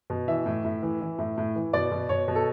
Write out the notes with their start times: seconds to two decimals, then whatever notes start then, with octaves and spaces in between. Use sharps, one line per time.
0.10 B2
0.28 E3 E5
0.46 A2
0.65 A2
0.83 E3
1.01 E3
1.18 A2
1.38 A2
1.56 E3
1.73 B2 D5
1.91 B2
2.09 B2 C#5
2.28 B2
2.35 A4